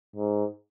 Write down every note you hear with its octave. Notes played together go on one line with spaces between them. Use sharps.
G#2